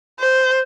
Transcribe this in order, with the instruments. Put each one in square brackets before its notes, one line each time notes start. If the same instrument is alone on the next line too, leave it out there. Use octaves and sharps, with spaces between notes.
[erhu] C5